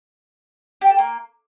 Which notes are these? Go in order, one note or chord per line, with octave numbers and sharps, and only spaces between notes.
G4
A4
A#3